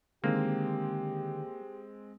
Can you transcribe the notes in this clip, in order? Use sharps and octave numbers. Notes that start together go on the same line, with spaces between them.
D3 D#3 G#3 A#3 C4 G4